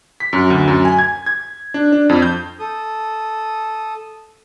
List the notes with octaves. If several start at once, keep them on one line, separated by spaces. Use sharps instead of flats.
B6
F#2
D2
F#2
G#5
G#6
G#6
D4
D4
F2
G6
A4 D#6